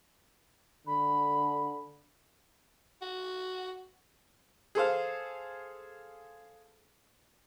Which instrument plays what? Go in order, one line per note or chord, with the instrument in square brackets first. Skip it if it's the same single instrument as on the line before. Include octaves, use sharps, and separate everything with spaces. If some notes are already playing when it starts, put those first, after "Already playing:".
[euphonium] D3 [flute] B5
[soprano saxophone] F#4
[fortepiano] G#4 A4 C5 F5